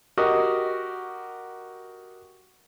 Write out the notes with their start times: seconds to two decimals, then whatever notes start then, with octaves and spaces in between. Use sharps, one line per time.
0.18 F#4 G4 A#4 D#5